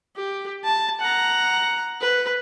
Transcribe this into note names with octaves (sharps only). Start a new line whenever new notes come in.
G4
A5
F#5 A#5
B4